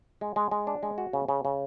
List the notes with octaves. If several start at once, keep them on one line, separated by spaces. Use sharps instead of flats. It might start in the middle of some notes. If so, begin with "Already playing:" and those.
G#3
G#3
G#3
D4
G#3
F#4
C#3
C#3
C#3